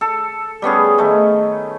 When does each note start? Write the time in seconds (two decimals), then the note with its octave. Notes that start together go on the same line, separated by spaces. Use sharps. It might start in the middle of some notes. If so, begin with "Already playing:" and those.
0.01 A4
0.62 G3 B3 C#4 G#4
0.98 D#3 A3